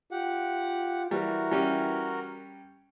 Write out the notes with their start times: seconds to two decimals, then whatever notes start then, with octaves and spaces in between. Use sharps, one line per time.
0.12 F4 G4 F#5
1.11 E3 G3 F#4 A#4
1.52 G3 C#4 G4